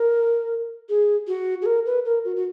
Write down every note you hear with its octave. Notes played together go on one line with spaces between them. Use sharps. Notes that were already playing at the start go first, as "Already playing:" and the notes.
Already playing: A#4
G#4
F#4
G#4
A#4
B4
A#4
F#4
F#4